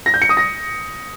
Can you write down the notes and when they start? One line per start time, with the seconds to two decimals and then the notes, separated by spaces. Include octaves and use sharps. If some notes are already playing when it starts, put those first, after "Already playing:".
0.06 A#6
0.14 G6
0.22 C#7
0.29 D#6
0.37 A#6